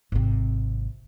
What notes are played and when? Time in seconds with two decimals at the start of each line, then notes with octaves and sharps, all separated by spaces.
0.12 G#1 C3